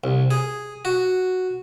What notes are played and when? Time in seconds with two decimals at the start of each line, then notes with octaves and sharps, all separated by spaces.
0.04 C2
0.31 G#4
0.85 F#4